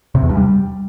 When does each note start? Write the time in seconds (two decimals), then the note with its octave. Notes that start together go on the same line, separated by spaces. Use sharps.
0.15 C3
0.22 E2
0.29 G2
0.37 G3